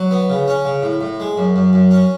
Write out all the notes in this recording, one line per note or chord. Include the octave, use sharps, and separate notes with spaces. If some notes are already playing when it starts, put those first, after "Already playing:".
Already playing: F#3
B3
C#3
C#4
C#3
A2
A2
G#3
F#2
F#2
F#2
C#4